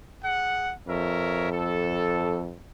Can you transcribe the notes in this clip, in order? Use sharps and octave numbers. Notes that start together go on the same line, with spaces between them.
G#4 F#5
F2 A#4 C#5 E5
A4